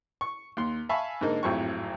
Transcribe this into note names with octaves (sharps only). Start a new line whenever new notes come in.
C#6
D#2 C6
E5 F5 G#5 A5 B5 C#6
G#2 D3 A#3 D#4
G#1 F2 A2 F#3 C#6